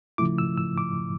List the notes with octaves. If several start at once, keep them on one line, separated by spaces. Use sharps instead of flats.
C#3 F3 A3 E4 D6
E6
E6
D6